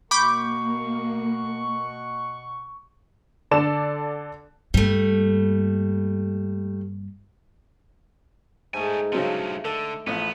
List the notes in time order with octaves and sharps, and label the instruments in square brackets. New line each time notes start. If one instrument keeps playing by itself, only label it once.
[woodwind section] B2 F#5 C#6 [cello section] A#3 [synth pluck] B5 D6 G6
[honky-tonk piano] D3 A4 D5 E7
[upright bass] G2 A#3 [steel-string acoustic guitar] G3 A3
[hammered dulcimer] G#2 A3 [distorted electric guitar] G3 G#5
[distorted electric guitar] G2 F3 [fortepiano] C#3 F#3 C4 [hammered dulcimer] A5
[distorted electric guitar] D3 [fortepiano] A4
[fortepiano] A1 F3 [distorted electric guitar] B3